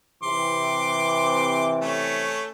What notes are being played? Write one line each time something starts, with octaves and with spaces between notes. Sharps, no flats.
C3 E3 C6 D6
A3 C#4